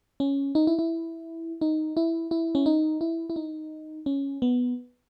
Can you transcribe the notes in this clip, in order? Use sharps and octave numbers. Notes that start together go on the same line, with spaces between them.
C#4
D#4
E4
E4
D#4
E4
E4
C#4
D#4
E4
E4
D#4
C#4
B3